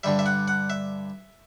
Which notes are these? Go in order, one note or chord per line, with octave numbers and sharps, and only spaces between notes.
G2 D3 G3 E5
E5
F#5
F#5
E5